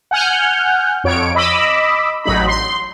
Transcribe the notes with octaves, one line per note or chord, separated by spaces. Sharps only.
F#5 G#5 F6 G6
F2 C#5 D7
D#5 B5 D6 E6
A1 F#3 D#4 B5
C6